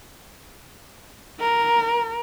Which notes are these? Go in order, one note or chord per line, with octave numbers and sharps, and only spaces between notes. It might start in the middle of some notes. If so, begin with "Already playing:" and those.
A#4